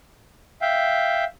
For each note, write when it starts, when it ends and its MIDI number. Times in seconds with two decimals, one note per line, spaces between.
0.62 1.24 76
0.62 1.24 77
0.62 1.24 79